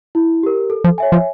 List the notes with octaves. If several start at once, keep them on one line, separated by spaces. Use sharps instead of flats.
E4
G4 A#4
A4
F3
C#5 E5 G#5
F3